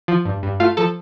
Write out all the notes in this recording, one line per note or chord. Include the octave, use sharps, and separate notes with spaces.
F3
G2
G2
A3 F4 F5
F3 A4 A5